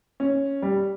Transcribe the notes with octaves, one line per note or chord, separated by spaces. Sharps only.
C#4
G3